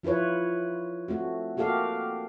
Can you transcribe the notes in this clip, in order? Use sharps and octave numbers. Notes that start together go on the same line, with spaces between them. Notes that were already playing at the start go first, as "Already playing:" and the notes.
F3 E4 F4 B4 C#5
A3 C4 F#4
A#3 F#4 G4 A4 F5